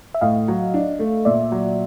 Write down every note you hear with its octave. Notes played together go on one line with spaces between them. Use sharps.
E5
A2 D#5 F5
F#3
D4
A3
A#2 D5 E5
F#3